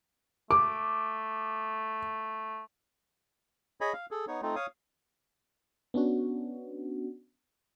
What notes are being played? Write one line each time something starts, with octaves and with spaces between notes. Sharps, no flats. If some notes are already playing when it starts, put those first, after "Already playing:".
A3 D6
G#4 C#5 D#5 G#5 B5
F5
G#4 A4
B3 D#4 C#5
A3 C4 D#4 F4
C#5 F5 D#6
B3 C#4 D4 F#4